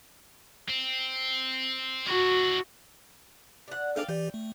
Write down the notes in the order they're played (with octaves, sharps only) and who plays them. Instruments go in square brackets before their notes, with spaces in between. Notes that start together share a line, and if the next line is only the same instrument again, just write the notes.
[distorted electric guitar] C4
[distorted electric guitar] D4 E4 [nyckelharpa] F#4
[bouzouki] D4 F#5
[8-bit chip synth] D4 G#4 A4 [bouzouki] D5 F5 G5
[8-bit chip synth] E3 G4 D5 [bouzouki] G5
[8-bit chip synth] A3